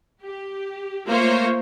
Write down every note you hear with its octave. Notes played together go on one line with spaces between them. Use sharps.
G4
A3 A#3 F4 C5 C#5